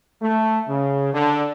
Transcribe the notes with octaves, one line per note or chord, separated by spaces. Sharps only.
A3
C#3
D3